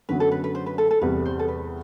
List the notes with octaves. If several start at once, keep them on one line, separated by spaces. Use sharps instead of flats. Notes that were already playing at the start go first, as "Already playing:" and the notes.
F#2 D3 F#3 B3 B4
A4
B4
B4
C5
B4
A4
A4
E2 C3 G3 B4
C5
A4
B4